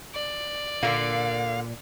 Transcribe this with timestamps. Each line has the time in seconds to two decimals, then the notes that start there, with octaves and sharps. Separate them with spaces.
0.14 D5
0.83 A#2 D3 A#3 F5